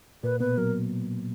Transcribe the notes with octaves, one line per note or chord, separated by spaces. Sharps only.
A#2 A#3 B4
B2 B3 B4
F#3 A#4